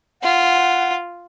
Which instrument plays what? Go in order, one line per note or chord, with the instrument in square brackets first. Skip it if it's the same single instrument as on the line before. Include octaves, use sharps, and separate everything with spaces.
[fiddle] F4 [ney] F#5